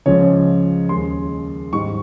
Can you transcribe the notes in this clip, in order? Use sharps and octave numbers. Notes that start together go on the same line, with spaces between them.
C#2 C#3 F3 G#3 C#5
D#2 C#3 G#3 C6
G#2 D#3 G3 C#6